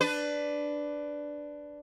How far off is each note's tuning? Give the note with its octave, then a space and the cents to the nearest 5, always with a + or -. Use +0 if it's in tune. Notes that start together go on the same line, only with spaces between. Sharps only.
D4 +0 B4 +15